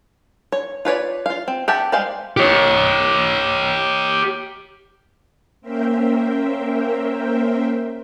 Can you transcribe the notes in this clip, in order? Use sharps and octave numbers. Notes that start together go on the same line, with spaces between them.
C#5
F4 B4 C#5 D5
F4 F5
C4
G4 E5 F#5 G5 A5
G3 G#3 C5 F5
G4 C#5
A#3 C#4 A#4 C5 E5 G5